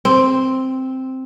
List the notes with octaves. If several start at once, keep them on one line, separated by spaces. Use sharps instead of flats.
C4